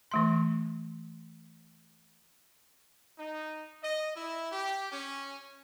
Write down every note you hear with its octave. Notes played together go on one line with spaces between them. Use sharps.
E3 A3 C6
D#4
D#5
E4
G4
C#4